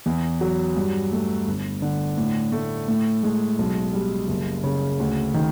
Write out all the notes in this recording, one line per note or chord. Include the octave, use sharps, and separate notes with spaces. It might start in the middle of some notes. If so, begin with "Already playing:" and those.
E2
F#3
G2
A3
G1
D3
A2
A3
A2
G#3
B1
G3
F#1
C#3
D2
D#3